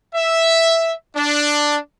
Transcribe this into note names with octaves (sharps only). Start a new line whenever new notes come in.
E5
D4